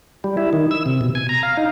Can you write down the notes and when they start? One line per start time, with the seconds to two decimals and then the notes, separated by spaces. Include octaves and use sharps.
0.24 G3
0.37 E4
0.53 D#3
0.71 E6
0.86 C3
1.01 B2
1.15 G#5
1.29 A#5
1.43 F5
1.57 D#4